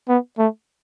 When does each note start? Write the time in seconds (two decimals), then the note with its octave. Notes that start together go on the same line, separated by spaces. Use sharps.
0.09 B3
0.38 A3